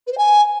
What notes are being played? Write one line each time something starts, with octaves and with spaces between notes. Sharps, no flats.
B4
C5
G#5